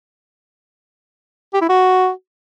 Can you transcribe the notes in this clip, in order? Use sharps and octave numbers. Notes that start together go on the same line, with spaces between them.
G4
E4
F#4